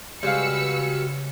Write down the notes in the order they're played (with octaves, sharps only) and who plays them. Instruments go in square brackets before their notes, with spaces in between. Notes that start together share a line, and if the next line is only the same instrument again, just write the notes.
[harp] C#3 [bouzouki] G3 F#4 [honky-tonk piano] G#3 F5 [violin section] B4 E6 C#7